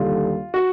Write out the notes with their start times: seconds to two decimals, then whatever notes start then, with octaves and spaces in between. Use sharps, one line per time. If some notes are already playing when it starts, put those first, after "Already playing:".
Already playing: D#2 D3 G3 F4
0.54 F#4